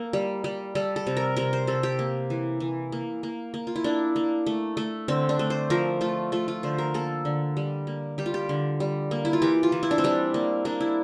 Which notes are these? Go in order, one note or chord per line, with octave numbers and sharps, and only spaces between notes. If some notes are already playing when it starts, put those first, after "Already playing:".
Already playing: A#3 A4
G3
G3
G3 A4
A4
C3
A#4
C3 A#4
C5
C3 A4
G4
A#3
E3
E3
A#3
A#3
A#3
F4
E4
A#3 D4
A#3
A3
A3
D3 C4
D4
A3
C5
F3 A#4
A3 F4
A3 F4
F4
D3 C5
A#4
A#3 A4
D3
G3
A#3
G3 G4
F4
G4
D3
G3
A#3
E4
F4
E3 G4
F4
E3
E4
D4
C4
G3 D4
A#3
A#3 D4
E4